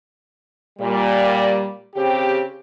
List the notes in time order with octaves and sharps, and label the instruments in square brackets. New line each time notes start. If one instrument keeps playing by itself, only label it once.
[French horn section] A#2 G3
C#3 C4 G4